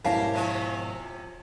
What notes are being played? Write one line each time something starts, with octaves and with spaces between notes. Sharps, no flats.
G#2 B2 E4 G4 A#4 C#5 F5 A5
C3 F3 C#4